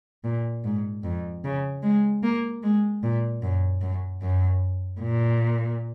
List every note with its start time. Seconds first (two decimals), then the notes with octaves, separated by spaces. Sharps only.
0.24 A#2
0.64 G#2
1.03 F2
1.44 C#3
1.83 G#3
2.23 A#3
2.63 G#3
3.03 A#2
3.42 F#2
3.81 F#2
4.22 F#2
5.01 A#2